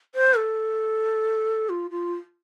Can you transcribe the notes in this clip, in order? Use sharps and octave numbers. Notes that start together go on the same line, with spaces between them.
C5
A4
F4
F4